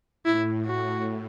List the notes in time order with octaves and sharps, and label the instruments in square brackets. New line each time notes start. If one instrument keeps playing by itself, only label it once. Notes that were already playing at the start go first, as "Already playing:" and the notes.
[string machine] A2 [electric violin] E4
[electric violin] F#4